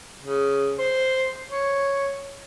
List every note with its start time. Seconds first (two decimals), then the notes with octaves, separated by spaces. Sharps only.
0.23 C#3
0.79 C5
1.50 C#5